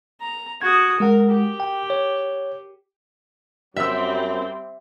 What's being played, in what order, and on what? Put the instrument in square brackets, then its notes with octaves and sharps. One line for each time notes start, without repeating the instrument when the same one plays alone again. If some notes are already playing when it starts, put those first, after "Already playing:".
[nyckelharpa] A#5
[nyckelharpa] F#4 D#6 [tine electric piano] G#6
[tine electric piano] G#3 F#5 [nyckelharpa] A#4
[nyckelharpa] G4
[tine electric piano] G5
C#5
[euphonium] F#2 [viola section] G3 C4 [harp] E5 E6